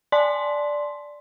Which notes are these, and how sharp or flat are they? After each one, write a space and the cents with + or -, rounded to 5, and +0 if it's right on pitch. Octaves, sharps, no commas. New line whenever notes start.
D5 +0 A5 -35 C6 +0